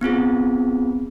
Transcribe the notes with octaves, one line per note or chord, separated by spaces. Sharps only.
B3 C4 F4 G#4